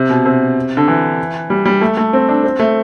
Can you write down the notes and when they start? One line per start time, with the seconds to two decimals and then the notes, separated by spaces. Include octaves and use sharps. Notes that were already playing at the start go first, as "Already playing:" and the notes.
Already playing: C3
0.09 B2
0.25 C3
0.77 D3
0.88 E3
1.50 G3
1.65 G3
1.81 A3
1.97 A3
2.13 C4
2.29 D4
2.44 C4
2.59 A3